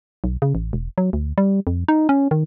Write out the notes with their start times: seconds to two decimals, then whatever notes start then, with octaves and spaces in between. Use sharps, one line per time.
0.24 B1
0.42 C#3
0.55 A1
0.73 E1
0.98 F#3
1.13 D2
1.38 G3
1.67 F2
1.88 D#4
2.09 C#4
2.31 D#3